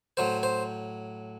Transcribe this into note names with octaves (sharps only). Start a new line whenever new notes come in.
A2 F#3 C5
C5